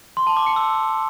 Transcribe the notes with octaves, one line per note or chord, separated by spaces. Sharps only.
C6
A5
D6
C#7
E6